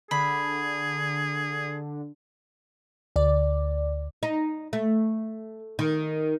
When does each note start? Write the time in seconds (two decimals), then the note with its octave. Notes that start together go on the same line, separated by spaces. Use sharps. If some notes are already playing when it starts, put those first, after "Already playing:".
0.11 D3 G#4 B5
3.16 D2 D5
4.23 D#4
4.73 A3
5.79 D#3